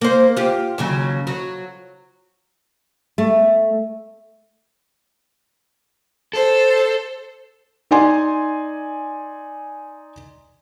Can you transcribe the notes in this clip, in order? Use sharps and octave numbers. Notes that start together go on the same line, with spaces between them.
A#3 C5
F4 G4
D#2 C#3 F#3
F#3
A3
A4 C5
D#4 D5 G#5 C6